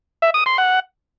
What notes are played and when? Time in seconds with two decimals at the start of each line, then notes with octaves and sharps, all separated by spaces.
0.22 E5
0.34 D#6
0.46 C6
0.58 F#5